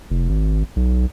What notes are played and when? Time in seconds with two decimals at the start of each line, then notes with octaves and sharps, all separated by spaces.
0.10 F1
0.29 G#1
0.76 B1